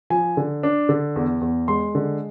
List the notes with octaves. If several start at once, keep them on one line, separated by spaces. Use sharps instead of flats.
F3 G#5
D3
D4
D3
E2
E2
G#3 C6
D3